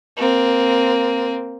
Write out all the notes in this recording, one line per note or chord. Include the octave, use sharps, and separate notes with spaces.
A#3 C4